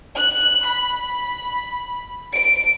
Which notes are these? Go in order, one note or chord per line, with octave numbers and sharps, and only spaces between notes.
F#6
B5
D7